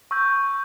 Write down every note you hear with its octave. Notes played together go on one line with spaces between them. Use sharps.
C#6 E6 G6